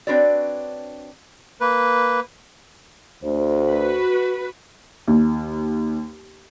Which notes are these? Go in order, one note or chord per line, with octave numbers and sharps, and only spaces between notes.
C4 D4 F#4 B4 C#5 D5
A#3 B4
D2 C5
F#4 B4
D#2